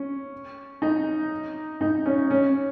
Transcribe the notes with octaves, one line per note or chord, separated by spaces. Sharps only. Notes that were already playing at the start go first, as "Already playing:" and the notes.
Already playing: C#4
D#4
D#4
C#4
C#4